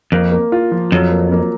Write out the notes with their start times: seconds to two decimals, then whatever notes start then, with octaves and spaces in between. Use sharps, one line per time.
0.12 F2 A#3
0.32 A#3
0.52 F4
0.72 F3
0.92 F2 F#3
1.11 A#3
1.32 A#3